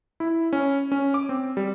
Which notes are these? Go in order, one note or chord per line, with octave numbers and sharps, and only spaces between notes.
E4
C#4
C#4
D6
C4
G3